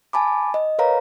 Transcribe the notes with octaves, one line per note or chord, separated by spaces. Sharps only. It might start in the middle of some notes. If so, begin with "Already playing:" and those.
G#5 A5 B5 D6
D#5
A#4 B4 C#5 F5 A#5